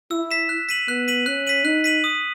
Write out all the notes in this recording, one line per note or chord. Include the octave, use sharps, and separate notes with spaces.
E4 E6
B6 E7
F#6
B6 D#7 F#7
B3 F#6
B6 D#7 F#7
C#4 F#6
B6 D#7 F#7
D#4 F#6
B6 D#7 F#7
D#6